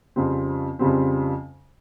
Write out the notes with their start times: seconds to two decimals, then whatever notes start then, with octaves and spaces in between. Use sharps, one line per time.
0.16 F2 C#3 G3 C4
0.79 F2 C#3 G3 C4